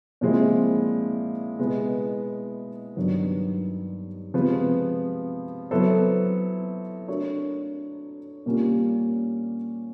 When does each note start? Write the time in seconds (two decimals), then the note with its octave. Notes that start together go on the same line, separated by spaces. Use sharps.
0.21 A#2 F3 G#3 C4 E4
1.59 B2 G#3 B3 E4
2.96 G2 D#3 F#3 B3
4.34 C3 F3 G#3 B3
5.71 F#3 B3 E4 A4 C5
7.08 A3 D4 F#4 A#4 C#5
8.46 A#2 G3 A#3 C#4 F4